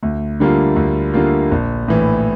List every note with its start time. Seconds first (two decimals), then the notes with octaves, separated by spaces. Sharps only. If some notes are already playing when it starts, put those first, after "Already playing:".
0.03 D2
0.40 D3 G3 A#3 F4
0.76 D2
1.14 D3 G3 A#3 F4
1.51 A#1
1.88 A2 E3